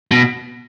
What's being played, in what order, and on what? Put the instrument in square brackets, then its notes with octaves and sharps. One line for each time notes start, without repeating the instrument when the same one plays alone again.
[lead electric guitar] B2